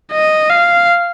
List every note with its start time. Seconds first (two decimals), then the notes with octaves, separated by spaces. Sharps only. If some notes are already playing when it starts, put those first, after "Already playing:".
0.13 D#5
0.50 F5